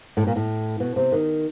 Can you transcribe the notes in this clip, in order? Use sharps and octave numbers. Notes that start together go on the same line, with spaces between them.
A2
A#2
A2
B2
C3
D#3